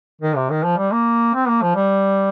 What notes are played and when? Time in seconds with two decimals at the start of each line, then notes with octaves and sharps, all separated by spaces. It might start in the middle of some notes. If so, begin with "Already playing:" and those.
0.21 D#3
0.36 C3
0.50 D#3
0.64 F3
0.77 G3
0.92 A#3
1.34 C4
1.48 A#3
1.62 F3
1.76 G3